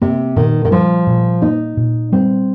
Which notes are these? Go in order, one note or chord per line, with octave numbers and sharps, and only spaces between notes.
C3 A#3
A#2 D#3
D#3
F3 G3
A#2
A#3 D#4
A#2
G3 C4